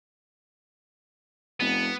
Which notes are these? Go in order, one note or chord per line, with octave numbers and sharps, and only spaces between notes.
F1 B3